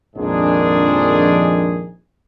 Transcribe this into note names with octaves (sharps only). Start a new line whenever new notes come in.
A#1 F2 G#2 D#3 D4 G#4